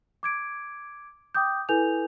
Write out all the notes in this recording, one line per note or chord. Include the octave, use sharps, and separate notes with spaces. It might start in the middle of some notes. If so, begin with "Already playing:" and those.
D6 G#6 D7
G5 D6 D#6 G6
E4 A4 B4 G#5 G6 F7